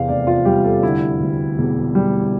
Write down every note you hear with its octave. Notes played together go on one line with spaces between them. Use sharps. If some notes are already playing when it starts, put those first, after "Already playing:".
Already playing: E2 C3 F5
F1 D5
F4
G3 G4
A4
D3 E4
D2
E1
G3